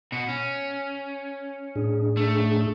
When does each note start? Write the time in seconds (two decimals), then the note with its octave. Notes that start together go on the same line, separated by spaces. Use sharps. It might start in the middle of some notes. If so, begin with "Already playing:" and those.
0.12 B2 F#4
0.29 C#4
1.76 A2 D4 G#4
2.17 A3